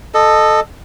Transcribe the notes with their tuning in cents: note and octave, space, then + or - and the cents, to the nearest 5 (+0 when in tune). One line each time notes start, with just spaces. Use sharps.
A4 +0 D#5 -20